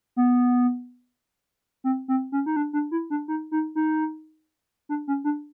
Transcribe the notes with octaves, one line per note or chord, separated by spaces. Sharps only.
B3
C4
C4
C#4
D#4
D4
D4
E4
D4
D#4
D#4
D#4
D4
C#4
D4